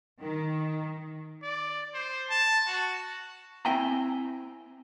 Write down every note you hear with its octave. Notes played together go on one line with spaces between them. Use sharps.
D#3
D5
C5
A5
F#4
C4 E4 E5 G5 G#5 A#5